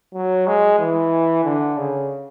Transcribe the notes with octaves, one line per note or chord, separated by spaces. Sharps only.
F#3
G#3
E3
D3
C#3